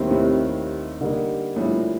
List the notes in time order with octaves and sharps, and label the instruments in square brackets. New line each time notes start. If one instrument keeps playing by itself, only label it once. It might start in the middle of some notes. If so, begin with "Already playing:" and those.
Already playing: [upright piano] D#2 D#3 G3 C4 G4 [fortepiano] A2 C3
[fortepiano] A2 C3
[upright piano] D3 G3 A#3 D#4
[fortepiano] A2
G2 A#2